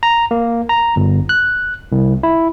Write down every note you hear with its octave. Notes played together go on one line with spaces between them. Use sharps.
A#5
A#3
A#5
G1
F#6
C2
E4